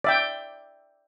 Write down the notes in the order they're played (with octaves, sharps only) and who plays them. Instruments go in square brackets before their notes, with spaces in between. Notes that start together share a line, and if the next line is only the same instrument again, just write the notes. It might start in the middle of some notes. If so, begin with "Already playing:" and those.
[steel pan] D5 E5 G5